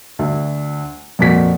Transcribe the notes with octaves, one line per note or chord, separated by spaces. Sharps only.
D2
F2 A#2 F#4 B6